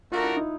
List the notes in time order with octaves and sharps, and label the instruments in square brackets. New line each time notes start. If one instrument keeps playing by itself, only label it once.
[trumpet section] A3 D4 F#4 A#4 [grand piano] F4
[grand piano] E4
D#4